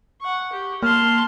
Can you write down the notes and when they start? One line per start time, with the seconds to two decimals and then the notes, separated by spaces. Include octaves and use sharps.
0.20 F#5 C#6
0.53 G4
0.83 A#3 A5 C6 F6